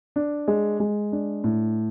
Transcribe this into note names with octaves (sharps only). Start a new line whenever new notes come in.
D4
G#3
G#3
D4
A2